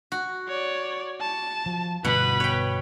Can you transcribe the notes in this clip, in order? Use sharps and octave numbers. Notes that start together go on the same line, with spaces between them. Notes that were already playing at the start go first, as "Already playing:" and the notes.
F#4
C#5 D5
A5
F3
G1 B2 B3 B4 F#5 B5
C#5 G5